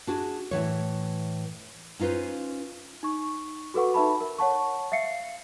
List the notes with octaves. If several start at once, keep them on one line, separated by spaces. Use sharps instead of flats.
D4 F#4 G#4
A2 E3 C#5
C#4 D#4 F4 B4 C5
D#4 C#6
F#4 A4 B4 F#5 C#6
D#4 B4 E5 A5 B5
A#4
C#5 F#5 A5 C#6
E5 F5 C7 C#7